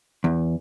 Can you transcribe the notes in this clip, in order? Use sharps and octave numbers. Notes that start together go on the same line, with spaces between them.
E2